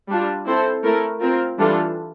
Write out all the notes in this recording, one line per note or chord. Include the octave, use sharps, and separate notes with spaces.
G3 D4 F4
C4 E4 A4 C5
A3 E4 A#4
C4 F4 A#4
E3 G3 D4 F4 A4